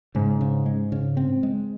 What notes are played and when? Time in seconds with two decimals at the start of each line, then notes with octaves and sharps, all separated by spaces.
0.15 G#2 C#3
0.41 C#3
0.66 G#3
0.92 C#3
1.17 C4
1.43 G#3